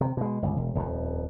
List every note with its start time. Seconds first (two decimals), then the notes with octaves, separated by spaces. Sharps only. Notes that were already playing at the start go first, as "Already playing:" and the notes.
0.01 C3
0.17 B2 G#3
0.42 G1 C#2
0.57 E1
0.75 D#1 F2